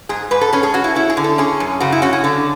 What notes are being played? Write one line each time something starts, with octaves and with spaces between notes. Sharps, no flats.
G#2 G#4
G#2 B4
A4
C#4 G#4
G#4
C#4 F#4
E4
C#4 E4
G#4
D3
A4
C#4 G#4
F#2
C#3 F#4
E4
C#4 F#4
G#4
D3 A4